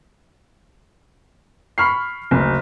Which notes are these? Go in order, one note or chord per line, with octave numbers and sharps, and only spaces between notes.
B5 C#6 F6 C7
F#1 D2